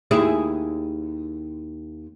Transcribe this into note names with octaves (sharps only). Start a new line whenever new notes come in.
D#2 E4 G#4